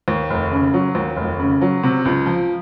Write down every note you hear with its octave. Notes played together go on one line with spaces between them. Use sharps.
D#2
F1
C#3
F#3
D#2
F1
C#3
F#3
C3
C#2
F3